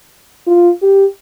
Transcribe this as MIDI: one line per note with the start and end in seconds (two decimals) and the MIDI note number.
0.47 0.70 65
0.82 1.05 67